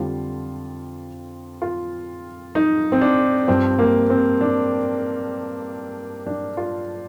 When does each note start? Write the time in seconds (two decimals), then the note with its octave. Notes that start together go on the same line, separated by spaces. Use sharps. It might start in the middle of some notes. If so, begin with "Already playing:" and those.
Already playing: F2 D3 G3 F4
1.62 F4
2.55 D#4
2.92 C4
3.01 D4
3.47 G2 F3 C4
3.79 A#3
4.10 C4
4.41 D4
6.27 D4
6.57 F4